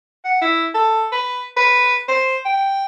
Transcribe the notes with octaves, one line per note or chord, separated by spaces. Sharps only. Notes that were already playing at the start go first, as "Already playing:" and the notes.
F#5
E4
A4
B4
B4
C5
G5